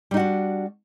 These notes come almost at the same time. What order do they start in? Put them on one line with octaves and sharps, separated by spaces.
G3 D#4 F#4 D4